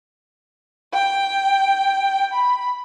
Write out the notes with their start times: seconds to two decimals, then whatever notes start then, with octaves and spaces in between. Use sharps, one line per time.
0.93 G5
2.33 B5